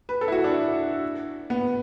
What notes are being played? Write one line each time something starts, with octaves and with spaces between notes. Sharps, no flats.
B4
A4
E4
F#4
D4
B3